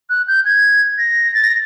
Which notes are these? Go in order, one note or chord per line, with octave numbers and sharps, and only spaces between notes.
F#6
G6
G#6
A#6
A6
A#6